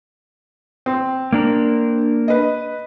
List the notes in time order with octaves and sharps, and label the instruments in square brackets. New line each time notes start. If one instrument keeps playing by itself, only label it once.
[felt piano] C4
[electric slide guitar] A#3 D4 A#4
[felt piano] B4 D#5